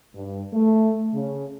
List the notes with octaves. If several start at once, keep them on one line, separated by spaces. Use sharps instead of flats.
G2
A3
C#3